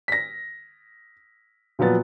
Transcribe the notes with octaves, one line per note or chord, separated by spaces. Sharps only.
A#6 B6
A#2 F3 F#3 B3 A6